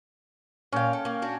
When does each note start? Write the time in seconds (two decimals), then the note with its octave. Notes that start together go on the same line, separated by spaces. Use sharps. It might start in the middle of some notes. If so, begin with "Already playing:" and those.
0.73 A#2 C#4 F5 G5
0.93 A4
1.05 A#3
1.22 D4 F#4